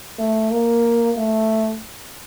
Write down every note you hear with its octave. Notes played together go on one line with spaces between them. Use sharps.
A3
A#3
A3